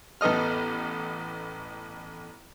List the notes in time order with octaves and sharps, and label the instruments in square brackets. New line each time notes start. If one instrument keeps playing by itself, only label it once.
[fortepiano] A1 B3 A4 D#5 F6